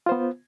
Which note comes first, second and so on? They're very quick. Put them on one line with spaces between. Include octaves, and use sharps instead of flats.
F4 C5 B3